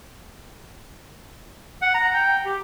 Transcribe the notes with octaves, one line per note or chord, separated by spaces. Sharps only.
F#5
A#5
G5
G4